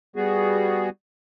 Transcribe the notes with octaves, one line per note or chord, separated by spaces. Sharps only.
G3 B3 F#4 G#4